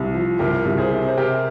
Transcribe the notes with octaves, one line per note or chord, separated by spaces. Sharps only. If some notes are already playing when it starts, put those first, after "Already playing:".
Already playing: C2
F3
C2 G4 A#4
C2
G#4 C5
C3
C5
C3 G4 A#4